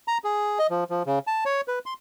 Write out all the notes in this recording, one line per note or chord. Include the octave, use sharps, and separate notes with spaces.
A#5
G#4
D#5
F3
F3
C#3
A5
C#5
B4
C6